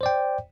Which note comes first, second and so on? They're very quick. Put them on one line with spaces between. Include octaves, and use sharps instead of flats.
C5 D5 G5